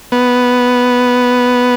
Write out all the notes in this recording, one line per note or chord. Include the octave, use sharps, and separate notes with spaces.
B3